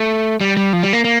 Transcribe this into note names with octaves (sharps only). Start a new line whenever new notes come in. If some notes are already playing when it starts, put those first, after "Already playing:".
Already playing: A3
G3
G3
F3
G3
A#3
A#3